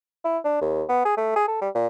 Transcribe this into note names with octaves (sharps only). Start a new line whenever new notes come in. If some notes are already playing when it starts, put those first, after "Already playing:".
E4
D4
D#2
B3
G#4
A3
G#4
A4
G3
A#2